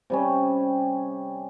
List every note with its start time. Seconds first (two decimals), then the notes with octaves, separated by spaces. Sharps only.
0.10 C3 G3 C#4